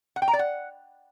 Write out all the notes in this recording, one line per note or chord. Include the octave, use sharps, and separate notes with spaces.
F#5
G5
A#5
D5
F#5